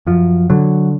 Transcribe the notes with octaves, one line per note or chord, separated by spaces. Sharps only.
F#2 F3
D3 F#3